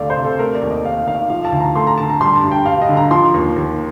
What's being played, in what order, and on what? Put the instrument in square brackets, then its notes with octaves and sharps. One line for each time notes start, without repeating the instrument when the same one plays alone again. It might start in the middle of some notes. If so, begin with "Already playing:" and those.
Already playing: [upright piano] D2 C3 A3 D5 F5
C5
C3
A4
A3 A#4
D5
D#2
D#5
D#2 F5
D#3 F5
F3 F5
A5
D2
A#5
A3 C6
A#5
D3 A5
A#5
G3 C6
A5
G2
G5
G2 F5
D#5
D3
A#5
F3 C6
D#2
D#2